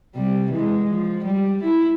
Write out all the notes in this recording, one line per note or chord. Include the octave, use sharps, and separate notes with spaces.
C3 G3
E3 G#3
F3
G3
E4